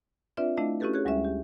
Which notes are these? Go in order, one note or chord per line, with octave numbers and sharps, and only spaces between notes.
C4 D4 F4 B4 D5 E5
A3 D4 E4 D#5 F5
C#4 E4 F#4 G4 A4 B4
G4 G#4 C#5 F#6
D2 G3 G#3 C#4 E5
G4